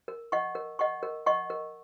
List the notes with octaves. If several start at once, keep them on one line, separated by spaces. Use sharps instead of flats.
A#4
D#5 F#5 C#6
A#4
D#5 F#5 C#6
A#4
D#5 F#5 C#6
A#4